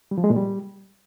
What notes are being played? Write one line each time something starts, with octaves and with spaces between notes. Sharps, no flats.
G3
F3
G#3
A#2
G3